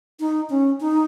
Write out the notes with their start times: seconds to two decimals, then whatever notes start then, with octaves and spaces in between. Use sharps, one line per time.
0.20 D#4
0.50 C#4
0.80 D#4